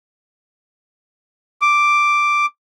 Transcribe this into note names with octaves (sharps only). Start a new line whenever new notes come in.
D6